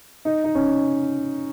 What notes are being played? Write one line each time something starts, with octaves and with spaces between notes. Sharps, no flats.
D#4
D#4
C#4